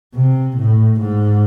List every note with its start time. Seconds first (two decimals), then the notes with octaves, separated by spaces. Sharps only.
0.15 C3
0.57 A2
1.00 G#2